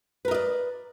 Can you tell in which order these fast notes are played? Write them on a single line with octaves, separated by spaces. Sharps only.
B4 A#4 D#5 D5